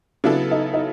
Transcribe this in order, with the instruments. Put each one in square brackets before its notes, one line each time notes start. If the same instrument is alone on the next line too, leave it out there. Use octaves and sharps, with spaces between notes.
[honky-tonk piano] C#3 F#3 B3 E4 A4 [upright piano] D4
[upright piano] D#4
D#4